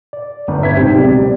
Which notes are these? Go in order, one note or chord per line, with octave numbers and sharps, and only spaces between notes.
D5
G1 B4
E2 E5 G#6 B6
G#2 C3 C4 G4
C#2 B2 F#3 G4 D5